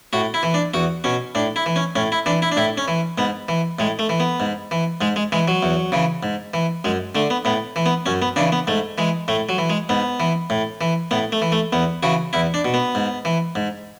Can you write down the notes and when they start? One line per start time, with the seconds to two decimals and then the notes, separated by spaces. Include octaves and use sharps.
0.13 A2 F#4
0.34 E4
0.43 E3
0.54 D4
0.74 E2 F#4
1.04 B2 C#4
1.35 A2 D4
1.56 E4
1.66 E3
1.76 C#4
1.96 A2 C#4
2.12 E4
2.26 E3 D4
2.42 E4
2.52 D4
2.57 A2 E4
2.77 C#4
2.88 E3
3.18 G#2 B3
3.49 E3
3.79 A2 G#3
3.99 A3
4.09 E3
4.20 B3
4.40 G#2
4.71 E3
5.01 G#2 G#3
5.16 G#3
5.32 E3 G#3
5.48 F#3
5.63 E2
5.92 C#3 E3
6.23 G#2
6.54 E3
6.84 F#2 G#3
7.15 D3 A3
7.30 B3
7.45 A2 B3
7.76 E3
7.86 B3
8.06 F#2 C#4
8.22 B3
8.36 C#3 E3 D4
8.52 B3
8.67 G#2 A3
8.98 E3 G#3
9.28 A2 A3
9.49 F#3
9.58 E3
9.70 G#3
9.89 G#2 B3
10.20 E3
10.50 A2
10.81 E3
11.11 A2 B3
11.32 A3
11.42 E3
11.52 A3
11.73 E2 B3
12.03 C#3 E3 F#4
12.33 E2 E4
12.54 D4
12.65 B2
12.74 B3
12.95 G#2
13.25 E3
13.55 G#2